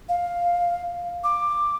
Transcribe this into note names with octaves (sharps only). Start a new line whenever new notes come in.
F5
D6